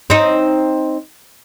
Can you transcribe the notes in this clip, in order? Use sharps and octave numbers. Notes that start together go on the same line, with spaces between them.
C4 D#4